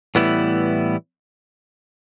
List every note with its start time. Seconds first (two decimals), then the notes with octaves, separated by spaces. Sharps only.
0.15 A2 E3 G3 B3 E4